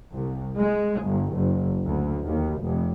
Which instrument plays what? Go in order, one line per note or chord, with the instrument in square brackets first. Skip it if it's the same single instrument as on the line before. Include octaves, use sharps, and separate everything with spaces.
[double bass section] C2
G#3
G1
F#1
D2
D#2
F1